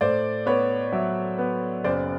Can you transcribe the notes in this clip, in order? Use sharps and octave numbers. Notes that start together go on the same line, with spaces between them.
A2 C5 D5
B3 B4 C#5
F#3 D5 E5
B3
F#1 C5 D5